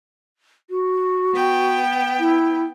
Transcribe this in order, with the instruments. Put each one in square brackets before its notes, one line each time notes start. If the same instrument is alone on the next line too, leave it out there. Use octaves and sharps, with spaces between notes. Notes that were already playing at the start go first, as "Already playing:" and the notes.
[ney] F#4
[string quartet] B3 G5
[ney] E4